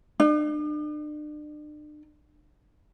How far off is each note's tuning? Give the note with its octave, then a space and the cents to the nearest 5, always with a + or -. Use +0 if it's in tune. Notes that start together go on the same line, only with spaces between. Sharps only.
D4 +40